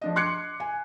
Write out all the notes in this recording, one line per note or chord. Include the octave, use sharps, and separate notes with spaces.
F3 D4 D#5
C6 D6 F#6 G#6 C7 C#7
G#5